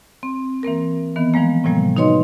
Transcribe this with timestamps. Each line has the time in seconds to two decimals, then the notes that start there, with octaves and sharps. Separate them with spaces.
0.23 C4
0.63 E3 A#3 C4 A#4
1.16 D#3 E3 B3
1.34 E3 F3 G#3 A#3
1.64 A2 C3 F3 G3 A#3
1.97 D#4 F#4 B4 C#5 D#5 C6